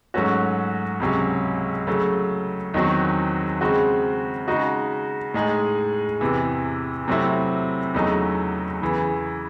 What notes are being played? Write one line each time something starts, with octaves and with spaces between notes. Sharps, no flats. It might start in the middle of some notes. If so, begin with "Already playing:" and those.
G#2 F#3 A3 C#4 F#4
C#2 C3 F#3 C#4
C#3 F#3 A3
E2 D#3 F#3 C4 F#4
C#3 G#3 C4 F#4
C#3 G#3 D#4 F#4
A2 G#3 D#4 G#4
E2 C3 E3
C3 F#3 A3 C4 E4
E2 C#3 F#3 A3 D#4
E2 C#3 E3